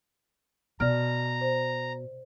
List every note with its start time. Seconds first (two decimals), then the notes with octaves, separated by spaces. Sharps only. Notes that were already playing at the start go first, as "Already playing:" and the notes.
0.80 B2 D5 A#5 F6
1.41 C5